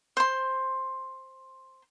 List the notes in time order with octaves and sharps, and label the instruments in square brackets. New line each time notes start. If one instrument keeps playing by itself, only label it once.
[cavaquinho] C5 C6